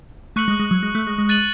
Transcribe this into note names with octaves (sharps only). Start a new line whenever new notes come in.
A3 C#6 F#6 C#7 F#7
G#3
G#3
F#3
G#3
A3
G#3
G#3
F#6 A6 D#7 F#7